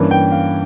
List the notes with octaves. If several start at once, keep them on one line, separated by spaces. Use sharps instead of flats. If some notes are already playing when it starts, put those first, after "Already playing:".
Already playing: G2 E3 A#3 C#4
G5
F5